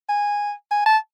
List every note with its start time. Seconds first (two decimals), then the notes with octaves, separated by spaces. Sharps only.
0.09 G#5
0.71 G#5
0.86 A5